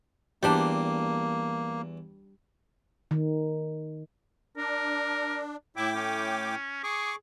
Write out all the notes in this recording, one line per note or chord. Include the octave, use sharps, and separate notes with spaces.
E2 G3 A#3 D4 C6
D#3
D4 A#4
A2 E4 G5 D6
C#4
G#4 C#6 D6